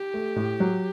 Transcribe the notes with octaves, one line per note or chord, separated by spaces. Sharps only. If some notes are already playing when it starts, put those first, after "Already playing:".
Already playing: G4
A3
A2
F#3